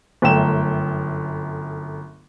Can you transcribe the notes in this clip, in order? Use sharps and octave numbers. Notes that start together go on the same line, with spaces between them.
G1 F#2 A3 G5 E7